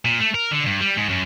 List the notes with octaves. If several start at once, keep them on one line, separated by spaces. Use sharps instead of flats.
A#2
A3
A#4
D3
G2
G3
G#2
F#2